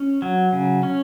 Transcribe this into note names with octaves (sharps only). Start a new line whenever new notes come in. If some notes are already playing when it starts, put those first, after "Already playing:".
Already playing: C#4
F#3
C#3
C#4